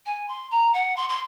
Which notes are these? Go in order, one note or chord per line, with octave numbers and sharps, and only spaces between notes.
G#5
C6
A#5
F#5
C6
C6